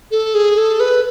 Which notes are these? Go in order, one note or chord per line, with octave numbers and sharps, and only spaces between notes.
A4
G#4
A4
B4